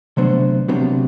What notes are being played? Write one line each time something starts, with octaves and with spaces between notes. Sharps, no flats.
D2 C3 F#3 B3 D4 C5
D2 C3 F#3 B3 D4